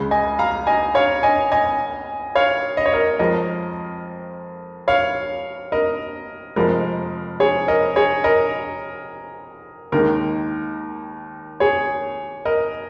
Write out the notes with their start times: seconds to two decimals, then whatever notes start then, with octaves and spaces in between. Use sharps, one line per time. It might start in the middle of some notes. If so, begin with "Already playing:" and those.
Already playing: C#2 C#3 G#3
0.11 D#5 G#5
0.39 F5 A#5
0.67 D#5 G#5
0.95 C#5 F5
1.23 D#5 G#5
1.52 D#5 G#5
2.35 C#5 F5
2.77 D#5
2.86 C#5
2.93 A#4 D#5
3.19 F2 F3 G#3 A#4 D#5
4.88 C#5 F5
5.72 A#4 D#5
6.56 F1 F2 F3 G#3 A#4
7.40 G#4 C#5
7.68 A#4 D#5
7.96 G#4 C#5
8.24 A#4 D#5
9.92 D#2 D#3 G#3 A#4
11.60 G#4 C#5
12.45 A#4 D#5